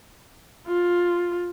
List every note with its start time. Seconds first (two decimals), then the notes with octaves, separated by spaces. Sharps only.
0.67 F4